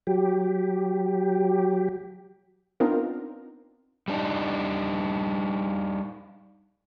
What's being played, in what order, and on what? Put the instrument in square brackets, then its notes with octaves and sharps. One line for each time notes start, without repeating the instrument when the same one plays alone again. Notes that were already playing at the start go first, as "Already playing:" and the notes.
[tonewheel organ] F#3 G4
[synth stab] B3 C4 D4 D#4 F4 A#4
[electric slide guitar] G3 D4 D#4